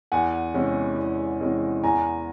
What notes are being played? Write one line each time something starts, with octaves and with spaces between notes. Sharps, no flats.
E2 F#5 G#5
C3 E3 G#3 C#4
E2
C3 E3 G#3 C#4
E2 G#5 A#5